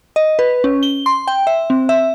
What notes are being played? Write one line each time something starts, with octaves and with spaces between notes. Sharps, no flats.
D#5
B4
C#4
G7
C6
G5
E5
C4
E5